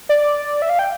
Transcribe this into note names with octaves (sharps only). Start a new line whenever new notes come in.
D5
E5
F5
G5